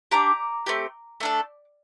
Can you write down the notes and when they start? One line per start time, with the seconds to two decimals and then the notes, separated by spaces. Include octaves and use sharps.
0.11 D4 G4 A#5 D6
0.66 A3 C4 G4
1.20 A3 D4 A4